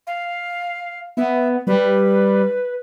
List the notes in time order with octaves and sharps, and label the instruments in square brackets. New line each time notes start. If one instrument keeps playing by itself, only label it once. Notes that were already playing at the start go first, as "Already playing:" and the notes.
[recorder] F5
[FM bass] B3 [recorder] E5
[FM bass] G3 [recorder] B4